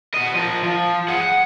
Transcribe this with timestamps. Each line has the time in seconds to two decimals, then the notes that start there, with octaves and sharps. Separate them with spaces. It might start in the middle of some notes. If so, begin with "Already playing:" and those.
0.14 F#4 D#5
0.34 F3 A#4
0.63 F3
1.08 G#4 F#5
1.21 F#5